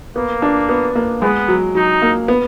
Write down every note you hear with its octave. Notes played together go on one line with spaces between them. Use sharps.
A#3 B3
D4
B3
A#3
G#3 B3
F#3
F#3 D#4
A#3
B3